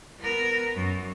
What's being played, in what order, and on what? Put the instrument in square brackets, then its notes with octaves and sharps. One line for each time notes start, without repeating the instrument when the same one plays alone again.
[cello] B3 A#4
F#2